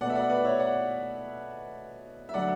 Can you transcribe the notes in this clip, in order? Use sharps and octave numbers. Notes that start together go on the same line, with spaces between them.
B2 A3 D5 F#5
E5
D5 F#5
B4 D5
C#5 E5
D5 F#5
E5
D3 F#3 A3 D5 F#5